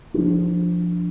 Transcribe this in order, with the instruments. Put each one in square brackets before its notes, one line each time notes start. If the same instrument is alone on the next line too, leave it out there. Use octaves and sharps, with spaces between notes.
[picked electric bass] F3 D4